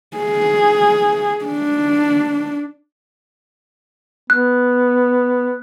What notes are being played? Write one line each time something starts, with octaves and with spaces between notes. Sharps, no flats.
G#4
D4
B3 F#6